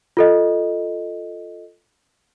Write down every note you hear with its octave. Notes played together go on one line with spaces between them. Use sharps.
F4 A4 D#5